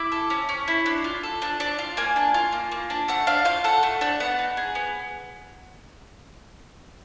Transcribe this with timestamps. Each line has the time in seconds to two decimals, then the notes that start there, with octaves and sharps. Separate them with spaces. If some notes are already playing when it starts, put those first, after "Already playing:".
Already playing: E4 D6
0.12 A4
0.30 C#4
0.49 C#4
0.68 E4
0.86 D4
1.04 F4
1.23 A4
1.42 D4
1.60 D4
1.79 F4
1.97 A#3 G#5
2.16 D4
2.34 F4
2.53 A#3
2.72 A#3
2.90 D4
3.08 A3 F#5
3.27 D4 F5
3.45 F4 F5
3.64 A4 F#5
3.83 A3
4.01 D4
4.20 B3 F#5
4.39 D#4
4.57 G#4
4.75 B3